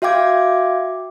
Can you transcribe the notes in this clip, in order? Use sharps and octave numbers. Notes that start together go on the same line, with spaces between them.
F#4 E5 F5 G5 D6 G#6